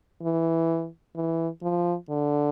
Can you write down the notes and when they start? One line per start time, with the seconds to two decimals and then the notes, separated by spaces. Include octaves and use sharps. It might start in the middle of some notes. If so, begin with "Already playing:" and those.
0.22 E3
1.15 E3
1.62 F3
2.09 D3